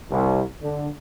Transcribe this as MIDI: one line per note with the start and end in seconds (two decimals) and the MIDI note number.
0.10 0.42 36
0.62 0.90 50